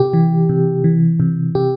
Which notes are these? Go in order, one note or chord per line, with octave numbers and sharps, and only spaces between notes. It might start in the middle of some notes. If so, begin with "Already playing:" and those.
Already playing: C3 G4
E3
C3
E3
C3
C3 G4